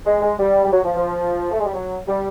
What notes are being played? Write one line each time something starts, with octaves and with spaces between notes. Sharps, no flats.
G#3
G#3
G3
G3
F#3
F3
F3
A3
G#3
G3
F#3
G3